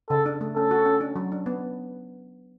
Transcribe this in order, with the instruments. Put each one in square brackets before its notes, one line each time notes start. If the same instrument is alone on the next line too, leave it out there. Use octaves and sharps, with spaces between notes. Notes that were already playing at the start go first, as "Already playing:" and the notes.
[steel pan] C#3 [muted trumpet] A4
[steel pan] D4
A3
[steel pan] C#4 [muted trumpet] A4
[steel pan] F#4
C#4
D4
F#3
D4
B3